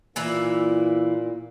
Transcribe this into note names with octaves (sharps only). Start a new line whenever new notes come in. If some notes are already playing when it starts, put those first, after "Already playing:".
A#2 E3 A#3 E4